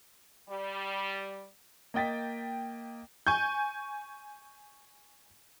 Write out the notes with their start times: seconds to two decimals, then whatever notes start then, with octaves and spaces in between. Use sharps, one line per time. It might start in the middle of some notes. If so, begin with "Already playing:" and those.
0.49 G3
1.94 A#3 D#5 G5 A6 B6
3.27 G#5 C#6 G6